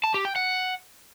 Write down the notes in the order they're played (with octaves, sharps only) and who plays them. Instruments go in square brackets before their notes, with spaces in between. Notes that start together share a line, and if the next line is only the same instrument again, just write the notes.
[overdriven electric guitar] A5
G4
G5
F#5